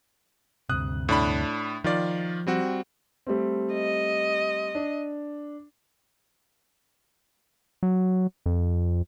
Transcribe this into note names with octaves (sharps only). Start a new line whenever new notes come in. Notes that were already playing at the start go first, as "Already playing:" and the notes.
D2 G2 C3 D#6 F#6
A2 D4 B5
D#3 F3 F4 D5
G3 C4 F#4
G3 A3 C4
D#5
D4
F#3
F2